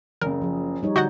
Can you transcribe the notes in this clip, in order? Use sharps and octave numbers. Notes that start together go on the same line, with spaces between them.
F#1 C#3 A#4
F3 G#4
G3 D#4 C#5
D3 F#4 D#5 F#5 G6